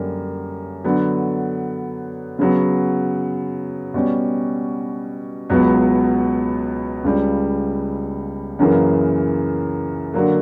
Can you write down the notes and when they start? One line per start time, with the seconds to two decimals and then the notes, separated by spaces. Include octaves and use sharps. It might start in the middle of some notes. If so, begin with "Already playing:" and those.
Already playing: F#2 D3 G3 A#3
0.84 D3 F#3 B3
2.39 C#3 F#3 B3
3.94 B2 G3 C#4
5.50 C#2 B2 F#3 B3
7.04 C#2 C#3 G3
8.59 F#2 C#3 E3 A#3
10.14 D3 F#3 A#3